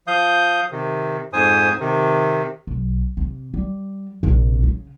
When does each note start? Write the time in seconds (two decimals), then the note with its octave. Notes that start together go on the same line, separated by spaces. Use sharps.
0.07 F3 F5 D#6 G6
0.71 C3 D#3
1.33 F2 G#2 C5 G#5 D#6
1.80 C3 D#3
2.67 B1
3.17 C3
3.54 G3
4.23 A#1 C3
4.63 C#3